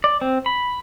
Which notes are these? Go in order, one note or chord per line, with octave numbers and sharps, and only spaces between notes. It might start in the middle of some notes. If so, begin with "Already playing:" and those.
D5
C4
B5